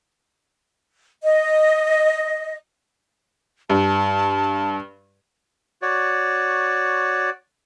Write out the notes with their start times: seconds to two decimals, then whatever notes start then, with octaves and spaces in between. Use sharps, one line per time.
1.23 D#5
3.70 G2 A5
5.82 F#4 C#5 D5